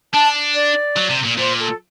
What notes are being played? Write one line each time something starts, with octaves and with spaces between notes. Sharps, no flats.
D4 A5
D5
F#3
C3
A#2
A#2 C5
A4